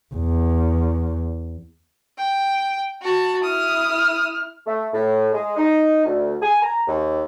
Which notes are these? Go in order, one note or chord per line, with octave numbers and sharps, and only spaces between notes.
E2
G5
F#4 A5
E4 D#6 F6
A3
A2
G#3
D#4
D2
G#5
A#5
D#2